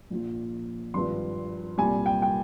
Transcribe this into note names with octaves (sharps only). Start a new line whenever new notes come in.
A#1 A#2 F3
G#1 G2 F3 C6
C2 A#2 G3 G#5
G5
G5